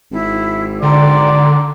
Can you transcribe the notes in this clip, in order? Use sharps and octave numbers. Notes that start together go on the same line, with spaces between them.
G#1 E4
D3 D5 G5 A#5 C6